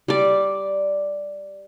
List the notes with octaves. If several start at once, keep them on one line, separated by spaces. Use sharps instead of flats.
G3 D5